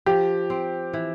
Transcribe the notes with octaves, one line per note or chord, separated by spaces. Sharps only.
F3 G4
C4
E3